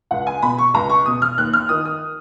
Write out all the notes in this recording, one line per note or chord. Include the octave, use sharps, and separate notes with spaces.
C#2 F#5
G#5
B2 B5
C#6
C#2 A#5
C#6
B2 D#6
F6
D#2 F#6
F6
D#3 D#6
D#6